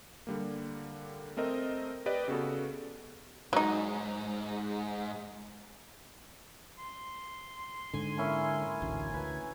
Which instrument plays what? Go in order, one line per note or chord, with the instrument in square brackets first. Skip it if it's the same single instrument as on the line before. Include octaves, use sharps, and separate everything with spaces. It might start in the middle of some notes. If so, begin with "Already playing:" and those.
[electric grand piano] D3 G3 A#3
A3 C4 A#4 D#5
G4 B4 D5 D#5
C#3 B3 F#4 A4
[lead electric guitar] G#2 [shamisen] F#3 D#4
[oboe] C6
[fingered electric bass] G#2 D3 [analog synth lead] G#5
[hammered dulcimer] A#3 C#4 E4
[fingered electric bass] A1 D2
[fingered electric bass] D2 [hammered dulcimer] B4